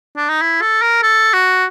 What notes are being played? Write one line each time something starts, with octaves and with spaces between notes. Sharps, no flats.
D4
D#4
E4
A4
A#4
A4
F#4